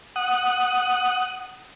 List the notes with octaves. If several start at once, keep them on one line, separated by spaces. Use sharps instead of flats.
F#5 D#6